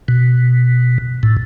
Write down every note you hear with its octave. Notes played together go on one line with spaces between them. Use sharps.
B2
A2